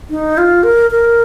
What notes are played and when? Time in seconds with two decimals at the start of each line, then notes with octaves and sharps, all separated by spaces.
0.10 D#4
0.38 F4
0.63 A#4
0.91 A#4